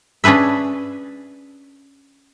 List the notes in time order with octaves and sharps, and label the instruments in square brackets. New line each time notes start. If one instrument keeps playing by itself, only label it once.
[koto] C#4 D4 G#4 B4 E5